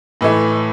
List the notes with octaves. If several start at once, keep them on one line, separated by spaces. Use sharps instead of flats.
A2 E3 A3